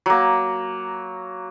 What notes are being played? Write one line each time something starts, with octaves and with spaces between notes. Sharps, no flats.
F#3 A#3